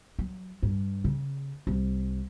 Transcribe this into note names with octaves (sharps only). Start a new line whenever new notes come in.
F#3
G2
C#3
C2